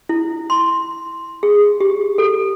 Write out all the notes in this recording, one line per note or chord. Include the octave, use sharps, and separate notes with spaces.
E4
C6
G#4
G4
A4